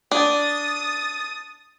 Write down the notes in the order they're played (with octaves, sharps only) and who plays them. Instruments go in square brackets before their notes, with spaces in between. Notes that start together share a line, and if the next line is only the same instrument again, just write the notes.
[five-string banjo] D4 [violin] D#6 A6